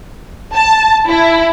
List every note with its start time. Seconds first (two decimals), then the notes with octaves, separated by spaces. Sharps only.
0.56 A5
1.08 E4